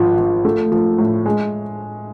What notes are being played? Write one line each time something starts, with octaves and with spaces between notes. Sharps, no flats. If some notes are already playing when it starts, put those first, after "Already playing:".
Already playing: G#1 F3
F3
A3
F3
A2
G#3